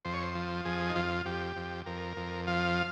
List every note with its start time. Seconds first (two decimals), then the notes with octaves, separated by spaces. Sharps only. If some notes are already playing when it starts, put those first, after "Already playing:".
0.05 F2 C5
0.14 C#5
0.22 C5
0.35 F3
0.65 F2 G#4
0.89 D#4
0.95 F2 F4
1.26 F2 G4
1.56 F2
1.86 F2 A#4
2.17 F2
2.47 F3 F5